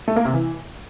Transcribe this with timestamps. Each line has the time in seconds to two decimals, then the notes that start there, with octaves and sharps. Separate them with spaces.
0.08 A3
0.16 A#3
0.25 C3
0.34 E3